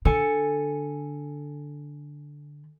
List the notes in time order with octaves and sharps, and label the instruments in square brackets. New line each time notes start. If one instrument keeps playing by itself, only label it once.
[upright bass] D3 [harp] A4 G#5 C#7